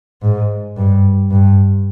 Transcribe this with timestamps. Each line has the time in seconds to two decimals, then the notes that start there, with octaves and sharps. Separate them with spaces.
0.22 G#2
0.77 G2
1.31 G2